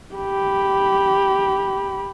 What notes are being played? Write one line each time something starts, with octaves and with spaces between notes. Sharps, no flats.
G4 B5